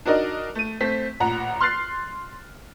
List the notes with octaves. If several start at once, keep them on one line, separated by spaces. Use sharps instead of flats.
D4 D#4 F#4 A#4 D5 D#5
A3 D#7
A3 C4 B6
A1 A#2 F#5 A#5
C6 F6 F#6 A6 C7